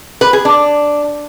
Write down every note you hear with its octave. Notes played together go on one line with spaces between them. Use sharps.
B4
G#4
D4